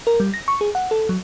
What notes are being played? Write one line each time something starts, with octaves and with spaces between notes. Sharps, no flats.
A#4
G3
A#6
C#6
G#4
F#5
A4
F#3